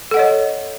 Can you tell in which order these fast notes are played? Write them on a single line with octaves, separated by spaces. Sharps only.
A4 F#5 D#5 C#5